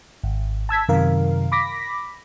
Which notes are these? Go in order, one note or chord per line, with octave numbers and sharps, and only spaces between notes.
G#1
A5 E6 G#6 B6
F#2 C3 D#3 A#4 F5
B5 D6 A#6 B6